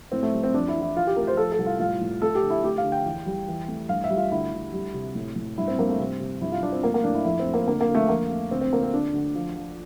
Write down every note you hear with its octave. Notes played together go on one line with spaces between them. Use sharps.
A2 C4
A3
G3
C4
F2 D4
E4
E3
E4
E3 F4
G4
A3 A#4
C5
F3 A4
A4
C2
F4
A2 F4
A2
A3 A4
G4
D3
E4
A3 G4
F5
D3
G5
E2
G3
E3
A3
G2 F5
E5
G3
F4
D2 E4
D2
G3
C3
A2
A2
G2 E4
C4
G2 A#3
A3
C3 C4
C3
G2 E4
F4
G2 D4
C4
A3 A#3
A#3
A2 D4
E4
F2 E4
C4
A3
A#3
D3 A#3
A#3
D3
A3
F2 A#3
A3
D2 C4
C4
D3 A#3
C4
D3 D4
D2
F3
F3